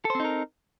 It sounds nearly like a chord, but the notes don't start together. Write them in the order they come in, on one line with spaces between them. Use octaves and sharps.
A4 C5 C4 D#4 A#4